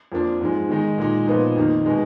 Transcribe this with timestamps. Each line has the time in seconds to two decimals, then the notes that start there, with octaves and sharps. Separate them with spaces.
0.12 F2 F3 A#3 D4
0.41 G#2 F3 G#3
0.69 D#3 G#3 D#4
0.98 A#2 G#3 D#4
1.27 A#2 F3 B3 D#4
1.56 F2 D#3 A#3 D#4
1.85 B2 G#3 D#4